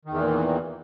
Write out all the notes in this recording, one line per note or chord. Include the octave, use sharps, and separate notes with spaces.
E2 A#2 D#3 E3